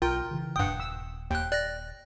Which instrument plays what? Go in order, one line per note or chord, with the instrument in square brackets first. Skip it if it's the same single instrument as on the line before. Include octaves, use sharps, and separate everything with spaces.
[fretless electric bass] B1 [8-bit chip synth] F4 [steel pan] A#4 G5
[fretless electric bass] C#3 E3
[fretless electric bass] D#1 [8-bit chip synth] G2 D#6 [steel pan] F#5 G5
[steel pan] E6
[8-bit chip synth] D#2 F#6 [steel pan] G5
[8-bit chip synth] D5 F#6 A#6